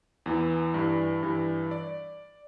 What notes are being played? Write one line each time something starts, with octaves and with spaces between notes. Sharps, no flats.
E2 E3
G2 E3
G2 E3
D5